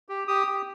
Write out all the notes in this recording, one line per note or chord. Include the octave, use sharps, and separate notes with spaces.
G4
G4 D#6
G4